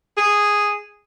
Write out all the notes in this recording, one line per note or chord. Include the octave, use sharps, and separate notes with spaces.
G#4